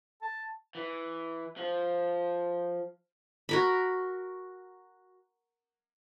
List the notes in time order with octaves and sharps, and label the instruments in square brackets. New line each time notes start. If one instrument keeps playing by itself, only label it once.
[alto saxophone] A5
[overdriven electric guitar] E3
F3
[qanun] F#4 A#4 B5